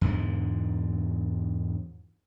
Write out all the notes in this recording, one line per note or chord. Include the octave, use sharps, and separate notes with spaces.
E2 G#2 D3 G#3